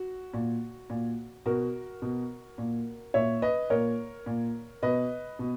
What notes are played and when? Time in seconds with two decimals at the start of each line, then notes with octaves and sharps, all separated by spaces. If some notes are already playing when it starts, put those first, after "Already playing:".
Already playing: F#4
0.34 A#2
0.90 A#2
1.46 B2 F#4 A#4
2.02 B2
2.58 A#2
3.14 A#2 C#5 E5
3.42 B4 D#5
3.70 A#2 A#4 C#5
4.26 A#2
4.82 B2 B4 D#5
5.39 B2